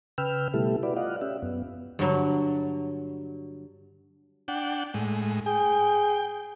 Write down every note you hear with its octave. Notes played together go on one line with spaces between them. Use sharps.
C#3 B4 G5 E6 F6
B2 G3 A3 E4 G4 A4
E4 F#4 B4 D5
F4 D5 D#5 F5 F#5
C#4 G4 E5
F#2 B3
G2 D3 F#3
D4 F#5 G5
A2 G#3
G#4 G5